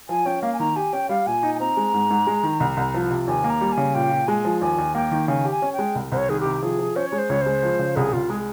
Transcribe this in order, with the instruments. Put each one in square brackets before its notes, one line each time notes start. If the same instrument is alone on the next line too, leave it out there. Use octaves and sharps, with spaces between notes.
[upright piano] F3 [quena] G#5
[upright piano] C#4 [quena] G5
[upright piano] A#3 [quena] F5
[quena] G#5
[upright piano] D#3 [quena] A#5
[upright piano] G4 [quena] G#5
[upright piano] C#4 [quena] G5
[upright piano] G3 [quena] F5
[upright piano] A#2 [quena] G#5
[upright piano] D#4
[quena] G#5
[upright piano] C4 [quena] A#5
[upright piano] G#3
G#2
G#2
G#3
D#3
C2
C2
F3
C3
[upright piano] D#2 [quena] G#5
[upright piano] A#3
[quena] A#5
[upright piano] G3
[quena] G#5
[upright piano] C#3
[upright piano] A#2 [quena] G5
[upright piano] A#2
[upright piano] G#3 [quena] G#5
[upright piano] F3
[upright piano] D#2 [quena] G#5
[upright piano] D#2
[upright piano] A#3 [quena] G5
[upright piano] D#3
[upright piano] C#3 [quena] G#5
[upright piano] G4
[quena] G#5
[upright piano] C#4
[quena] G5
[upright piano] G#3
C2
[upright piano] C2 [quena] C5
[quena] C#5
[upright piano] D#3 [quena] G#4
[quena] G4
[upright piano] C3
[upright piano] F3 [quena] G#4
[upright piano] F3
[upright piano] C#4 [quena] C5
[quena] C#5
[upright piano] G#3
[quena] C5
[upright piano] C#2 [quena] C#5
[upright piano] G#3 [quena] C5
[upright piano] F3
C#3
[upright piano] C2 [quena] G#4
[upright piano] C2 [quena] F4
[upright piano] G#3 [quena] G#4